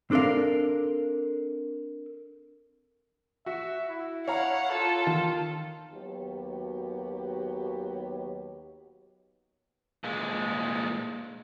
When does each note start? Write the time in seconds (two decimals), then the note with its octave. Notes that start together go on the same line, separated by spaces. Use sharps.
0.11 C4 D4 A4 A#4 F5
3.46 F#4 E5
3.89 E4
4.27 C#5 F5 F#5 A#5
4.72 F4 A4
5.07 D#3
5.93 D#2 F#3 B3 F#4 G4
10.04 A#2 G#3